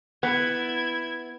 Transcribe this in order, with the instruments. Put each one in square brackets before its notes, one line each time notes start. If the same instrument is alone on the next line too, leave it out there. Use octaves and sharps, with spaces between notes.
[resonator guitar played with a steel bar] B3 [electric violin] E4 G#6